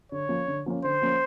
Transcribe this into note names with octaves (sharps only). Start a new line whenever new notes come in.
D3 C#5
F3 A#3 C#4
D3
F3 A#3 C#4
D3 C5
F3 A#3 C#4